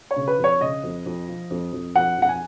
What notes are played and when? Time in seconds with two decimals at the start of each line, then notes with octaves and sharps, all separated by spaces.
0.11 C#5
0.16 C#3
0.28 B4
0.38 F2
0.44 C#5
0.61 C#3 D#5
0.83 F2
1.06 F2
1.28 F3
1.50 F2
1.73 F2
1.95 F2 F#5
2.18 F2 F#5
2.29 G#5